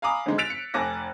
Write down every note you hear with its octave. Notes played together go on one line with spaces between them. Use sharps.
F5 G#5 A#5 B5 D6 D#6
G#1 G#2 D3 G#3
E6 F#6 A6 B6 D7 F7
C#7
F1 G#5 A5 D6 F#6 A#6